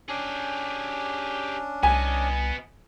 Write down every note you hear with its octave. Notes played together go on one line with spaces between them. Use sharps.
C#4 D4 G4 G#4
C2 B3 D#5 G#5